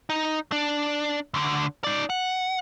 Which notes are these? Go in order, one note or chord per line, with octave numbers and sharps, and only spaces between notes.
D#4
D4
D2 D3
D#4 D5
F#5